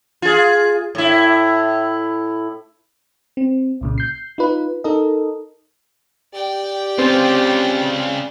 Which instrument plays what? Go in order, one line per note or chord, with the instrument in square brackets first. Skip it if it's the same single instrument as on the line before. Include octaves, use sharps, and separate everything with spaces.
[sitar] F4 G#4
A2 E4
[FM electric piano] C4
C2 A#2 C#3
G6 C7
D#4 F4 B4
D#4 A4 A#4 D#5
[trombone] G4 [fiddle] D5 G5
[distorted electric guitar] C#3 F4 [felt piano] C4